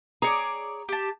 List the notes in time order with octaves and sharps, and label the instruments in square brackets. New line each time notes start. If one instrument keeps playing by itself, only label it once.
[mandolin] G#4 C#5 D5 [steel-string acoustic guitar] A#5
[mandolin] G4 A5